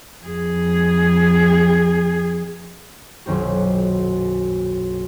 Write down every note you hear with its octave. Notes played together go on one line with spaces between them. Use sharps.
F2 G#4
D#1 B1 F#2 D#3 C4 G4